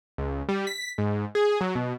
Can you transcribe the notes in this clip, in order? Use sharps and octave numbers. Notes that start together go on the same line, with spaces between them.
C#2
G3
B6
G#2
G#4
F#3
B2